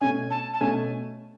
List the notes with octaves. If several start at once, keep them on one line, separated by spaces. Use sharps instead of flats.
B2 A3 C#4 G#5
A5
A5
B2 A3 C#4 G#5